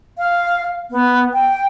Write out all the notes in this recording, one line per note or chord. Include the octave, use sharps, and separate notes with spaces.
F5
B3
G5